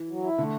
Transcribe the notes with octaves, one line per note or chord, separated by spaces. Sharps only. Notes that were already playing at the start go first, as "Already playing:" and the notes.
Already playing: E3
F#3
E4
D3 A3